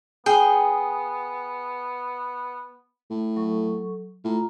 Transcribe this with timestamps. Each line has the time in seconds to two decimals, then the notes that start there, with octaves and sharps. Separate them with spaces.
0.26 B3 G#4 G5
3.10 A2
3.37 F#3 A4 C#6
4.25 A2 F4 A#5